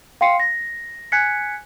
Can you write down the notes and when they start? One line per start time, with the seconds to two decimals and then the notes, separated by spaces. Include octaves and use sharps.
0.21 F5 G5 C6 C7 C#7
0.40 A#6
1.12 G#5 F#6 G#6 B6 C#7